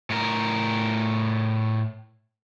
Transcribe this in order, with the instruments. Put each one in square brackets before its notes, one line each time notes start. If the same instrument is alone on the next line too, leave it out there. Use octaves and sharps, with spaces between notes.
[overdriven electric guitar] A2 A#4